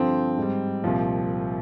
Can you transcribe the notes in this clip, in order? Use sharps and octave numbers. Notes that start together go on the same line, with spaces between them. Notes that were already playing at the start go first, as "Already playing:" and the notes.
Already playing: G2 D3 F3 C4
G#2 G3
C2 A#2 F3